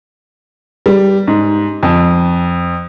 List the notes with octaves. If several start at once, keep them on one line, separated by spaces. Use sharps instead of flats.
G3
G#2
F2